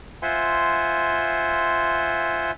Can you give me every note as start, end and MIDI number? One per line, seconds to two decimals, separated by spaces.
0.22 2.51 65
0.22 2.51 72
0.22 2.51 76
0.22 2.51 78
0.22 2.51 80
0.22 2.51 84